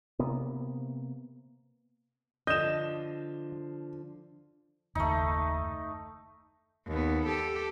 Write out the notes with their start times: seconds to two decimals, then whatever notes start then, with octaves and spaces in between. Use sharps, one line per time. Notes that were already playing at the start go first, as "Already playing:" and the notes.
0.19 C3 A#3 B3
2.47 D3 F3 D#5 G6 E7
4.95 F#1 D#2 A3 D#4
6.87 D#2 B3
7.27 G4 A4